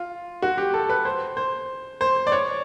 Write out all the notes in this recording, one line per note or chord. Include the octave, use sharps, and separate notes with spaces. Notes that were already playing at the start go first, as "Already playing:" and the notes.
Already playing: F4
F#4
G4
A4
B4
C5
C5
C5
D5
C#5